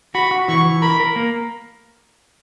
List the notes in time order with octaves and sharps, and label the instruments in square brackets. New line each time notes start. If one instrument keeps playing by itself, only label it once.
[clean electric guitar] F#4 [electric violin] B5
[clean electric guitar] F#4
[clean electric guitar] E3 [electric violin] C#6
[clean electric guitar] E3
[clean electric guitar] A#4 [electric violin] B5
[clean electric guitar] A#4
A#3